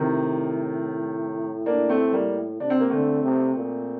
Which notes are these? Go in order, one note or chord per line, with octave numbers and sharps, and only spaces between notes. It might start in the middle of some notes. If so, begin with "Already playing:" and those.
Already playing: A2 C3 D#3
A#3 D4
A3 C4
G3 A#3
C3 D4
C4
A#3
D3 A3 C4
C3
A#2